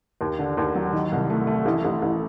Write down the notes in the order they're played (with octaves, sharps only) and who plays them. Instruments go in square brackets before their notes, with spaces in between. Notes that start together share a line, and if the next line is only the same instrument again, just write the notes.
[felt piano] D#2
D3
D#2
F#3
D#3
C2
A3
A3
A1
A1
A1